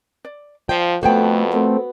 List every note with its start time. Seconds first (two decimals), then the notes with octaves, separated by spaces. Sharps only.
0.25 D5
0.69 F3 D5 F5 G5
1.03 F2 A3 B3 F#4 C5 C#5 G5
1.53 A3 C4 A#4